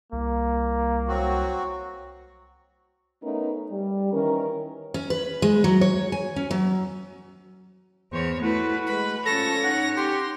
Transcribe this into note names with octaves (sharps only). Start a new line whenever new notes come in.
C2 A#3
F#3 C4 F#4
A3 B3 C#4 D#4 A#4 B4
G3
D#3 E3 C#4 A#4
C#4
B4
G#3
F#3
C#5
G#5
C#4
F#3
E2 C5 C#5
A3 E4 F#4 B4
G#3 B4 B5
F3 C#4 A4 C#5 A#6
D#4 F#5
G4 C6